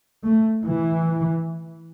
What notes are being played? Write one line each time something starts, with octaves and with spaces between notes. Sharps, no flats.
A3
E3